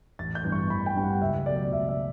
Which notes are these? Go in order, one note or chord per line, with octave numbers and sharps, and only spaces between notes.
A1 A6
G6
G2 E3 G3 B3
C#6
A1 B5
G5
G2 E3 G3 B3
F#5
C#2 E5
B2 F#3 A3 D5
C#2 E5
E5